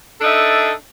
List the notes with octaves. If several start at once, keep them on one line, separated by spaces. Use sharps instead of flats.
D4 D#4 A4 E5